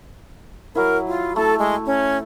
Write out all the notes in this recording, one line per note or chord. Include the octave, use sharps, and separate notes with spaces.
F#3 E4 A#4
F4
A3 E4 A4
G#3
C#4